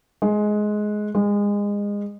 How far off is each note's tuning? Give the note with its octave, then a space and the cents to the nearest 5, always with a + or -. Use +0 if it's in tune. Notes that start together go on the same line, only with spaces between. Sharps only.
G#3 +15
G#3 -25